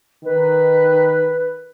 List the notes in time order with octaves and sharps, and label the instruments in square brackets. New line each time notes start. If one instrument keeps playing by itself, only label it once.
[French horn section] D#3 [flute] B4